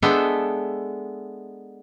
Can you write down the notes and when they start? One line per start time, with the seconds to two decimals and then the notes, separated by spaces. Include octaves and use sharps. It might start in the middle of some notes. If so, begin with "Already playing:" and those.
0.02 G#3 B3 D4 A4 E5 G5